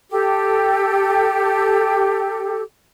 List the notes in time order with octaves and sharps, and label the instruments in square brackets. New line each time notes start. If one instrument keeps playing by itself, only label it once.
[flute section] G4 A4